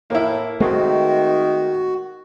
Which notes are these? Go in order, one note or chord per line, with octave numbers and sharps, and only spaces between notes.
A2 A#3 E4
D#3 G#3 A3 C4 F#4